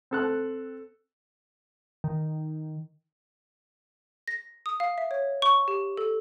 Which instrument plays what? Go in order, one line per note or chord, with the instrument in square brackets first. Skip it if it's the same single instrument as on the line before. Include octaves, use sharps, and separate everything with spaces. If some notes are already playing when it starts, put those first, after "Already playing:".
[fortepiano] C4 A4 F#6
[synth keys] D#3
[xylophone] A#6
D#6
F5
E5
C#5
C#6
G4
A4